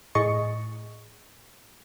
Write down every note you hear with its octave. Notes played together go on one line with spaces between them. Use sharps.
A2 G#4 D#5 C#6 A6 C#7